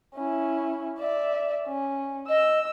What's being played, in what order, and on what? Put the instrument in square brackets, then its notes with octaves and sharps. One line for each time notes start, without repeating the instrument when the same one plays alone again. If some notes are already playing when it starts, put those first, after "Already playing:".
[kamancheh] C#4 E4
D5 E5
C#4
[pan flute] D#5 [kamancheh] E6